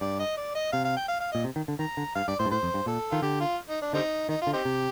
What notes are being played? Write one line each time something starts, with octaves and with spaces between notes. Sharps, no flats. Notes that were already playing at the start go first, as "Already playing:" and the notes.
G2 D5
D#5
D5
D#5
C3 F5
F5
G5
F5
F5
A#2 D#5
C3
D#3
D3
D#3 A#5
D3
G2 F5
G2 D5
A2 C5
G2
A2 C5
F2
G2
A#2 A4
D#3 F4
D3 G4
F4
D#4
D4
D3 G3 C4 D#4
D#3 D#4
F4
D3
C4 D#4 G4
C3